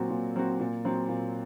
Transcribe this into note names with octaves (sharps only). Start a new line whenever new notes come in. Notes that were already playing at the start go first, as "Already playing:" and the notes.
Already playing: A#2 F#3 C4 F#4
A#2
F#3 C4 F#4
A#2
F#3 C4
A#2